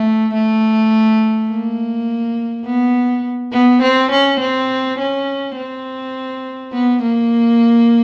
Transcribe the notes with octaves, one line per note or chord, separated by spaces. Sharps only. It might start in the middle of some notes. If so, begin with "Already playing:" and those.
Already playing: A3
A3
A#3
B3
B3
C4
C#4
C4
C#4
C4
B3
A#3